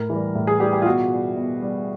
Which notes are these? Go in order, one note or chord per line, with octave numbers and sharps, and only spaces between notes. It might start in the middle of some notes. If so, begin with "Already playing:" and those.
Already playing: A2 A#4
E3 G3
A2
G#4
E3 G3 G4
G4
F4
B2 F#4
G3
B2
G3